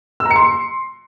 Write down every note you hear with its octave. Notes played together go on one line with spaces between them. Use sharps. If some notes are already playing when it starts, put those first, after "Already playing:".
E6
A#5
C#7
C6